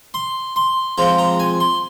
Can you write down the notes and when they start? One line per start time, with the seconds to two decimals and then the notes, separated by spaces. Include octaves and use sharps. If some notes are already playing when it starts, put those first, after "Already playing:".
0.14 C6
0.56 C6
0.98 F3 G#3 C4 A#5
1.18 A#5
1.39 G#5
1.60 C6